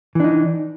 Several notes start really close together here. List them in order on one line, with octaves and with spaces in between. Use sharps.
E3 D4 D#4